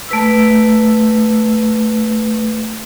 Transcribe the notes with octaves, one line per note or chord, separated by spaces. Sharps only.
A3 B4 E6